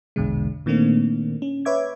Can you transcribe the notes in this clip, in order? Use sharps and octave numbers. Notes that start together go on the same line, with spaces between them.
A#1 E2 B2 D3 G#3
A#2 D#3 A3 A#3 C4 D4
C#4
B4 C#5 E5 D6 G#6